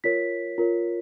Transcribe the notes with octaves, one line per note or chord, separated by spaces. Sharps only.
F4 A#4 C#5 B6
F4 A#4 C#5